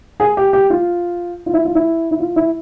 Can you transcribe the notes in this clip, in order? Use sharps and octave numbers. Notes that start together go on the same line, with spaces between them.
G#4
G4
G4
F4
F4
E4
F4
E4
E4
F4
E4